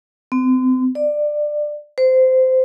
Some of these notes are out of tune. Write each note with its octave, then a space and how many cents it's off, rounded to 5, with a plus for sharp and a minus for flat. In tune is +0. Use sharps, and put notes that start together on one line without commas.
C4 -35
D5 +20
C5 -15